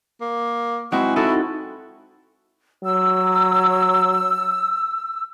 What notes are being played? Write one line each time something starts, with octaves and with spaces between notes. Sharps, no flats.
A#3
G#3 C4 E4 F#4
D#4 E4 F#4 A4
F#3 E6